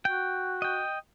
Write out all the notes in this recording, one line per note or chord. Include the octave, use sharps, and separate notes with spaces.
F#4 G5
D#5 G5